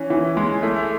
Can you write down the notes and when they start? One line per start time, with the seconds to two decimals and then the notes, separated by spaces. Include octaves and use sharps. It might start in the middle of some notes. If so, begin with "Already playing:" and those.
Already playing: E3 C#4
0.10 E3
0.37 G#3
0.63 A3